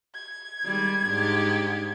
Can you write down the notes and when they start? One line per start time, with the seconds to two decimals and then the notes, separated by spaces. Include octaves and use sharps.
0.15 G#6
0.64 D#3 G3 G#3
1.06 G#2 D4 G4